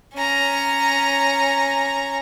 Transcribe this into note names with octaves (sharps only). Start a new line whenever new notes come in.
C#4 A#5